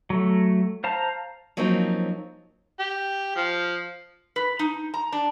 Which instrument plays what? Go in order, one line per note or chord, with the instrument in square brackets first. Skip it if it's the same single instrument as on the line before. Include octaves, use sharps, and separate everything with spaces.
[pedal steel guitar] F#3 A3
C5 F5 A5 A#5
[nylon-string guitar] F3 F#3 A#3 C4 C#4 D#4
[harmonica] G4
F3
[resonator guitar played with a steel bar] B4
D#4
A#5
D4